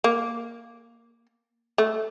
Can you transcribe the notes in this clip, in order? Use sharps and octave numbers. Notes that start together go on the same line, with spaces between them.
A#3
A3